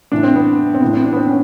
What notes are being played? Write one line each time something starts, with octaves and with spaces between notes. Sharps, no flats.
A2 E3 D4
C4
B3
C4
A2 E3 B3
C4
D4
B3
C4
C#4